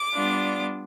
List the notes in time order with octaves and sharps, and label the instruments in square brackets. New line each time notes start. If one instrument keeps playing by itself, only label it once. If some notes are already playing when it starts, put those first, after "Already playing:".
Already playing: [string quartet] D6
G3 B3 D4 F4